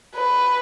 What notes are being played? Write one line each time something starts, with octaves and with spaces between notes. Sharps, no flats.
B4